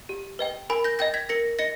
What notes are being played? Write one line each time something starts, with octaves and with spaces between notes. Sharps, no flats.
G4
B4 D#5 G5
A#4 G#5 B5
G6 A#6
D#5 G5 G6 A#6
G#6 B6
A#4 A#6 C#7
D#5 A#6 C#7